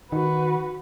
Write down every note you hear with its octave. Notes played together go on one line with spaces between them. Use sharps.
D#3 F#4 B4